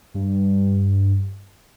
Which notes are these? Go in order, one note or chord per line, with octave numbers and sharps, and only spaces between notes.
G2